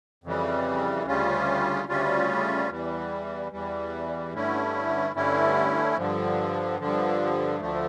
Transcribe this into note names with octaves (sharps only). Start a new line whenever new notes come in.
F2 C#3 E3 G3
D2 C#3 G3 C#4 F4
D2 C#3 G3 C#4 F4
E2 E3 G3
E2 E3 G3
G2 D3 A3 C#4 E4
G2 D3 A3 C#4 E4
G2 D3 F3
G2 D3 F3
D2 D3 F3 A3